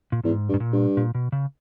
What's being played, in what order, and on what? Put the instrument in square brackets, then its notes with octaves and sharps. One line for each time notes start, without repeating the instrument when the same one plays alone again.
[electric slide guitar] A#2
[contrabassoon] E2 [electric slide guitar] G#2
[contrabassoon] G2
[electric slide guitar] G#2
A#2
[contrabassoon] G2
[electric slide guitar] A#2
B2
C#3